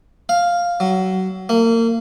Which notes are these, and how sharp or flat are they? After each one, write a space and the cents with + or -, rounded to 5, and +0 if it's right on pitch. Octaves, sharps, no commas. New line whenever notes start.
F5 +0
F#3 +25
A#3 -30